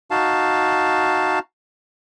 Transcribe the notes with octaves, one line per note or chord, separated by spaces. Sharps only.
D#4 F#4 F5 A5